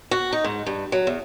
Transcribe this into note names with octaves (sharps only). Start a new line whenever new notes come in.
F#4
D#4
G#2
G2
F#3
E2